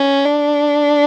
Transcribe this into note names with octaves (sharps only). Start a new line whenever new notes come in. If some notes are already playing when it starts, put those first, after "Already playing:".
Already playing: C#4
D4